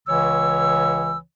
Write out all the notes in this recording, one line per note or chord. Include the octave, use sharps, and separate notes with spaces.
C#2 C#3 E3 C#5 E6